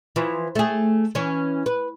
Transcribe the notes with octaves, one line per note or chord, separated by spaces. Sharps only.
E3 F3
A3 G#4
E3 C#4
B4